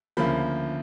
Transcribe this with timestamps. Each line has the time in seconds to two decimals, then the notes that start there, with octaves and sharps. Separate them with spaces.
0.17 D2 C#3 F3 A#3 B5